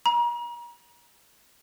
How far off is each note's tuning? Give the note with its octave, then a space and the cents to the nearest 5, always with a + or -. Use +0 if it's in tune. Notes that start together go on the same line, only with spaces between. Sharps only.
A#5 +35